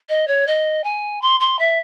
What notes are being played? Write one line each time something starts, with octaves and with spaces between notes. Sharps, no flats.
D#5
C#5
D#5
G#5
C6
C6
E5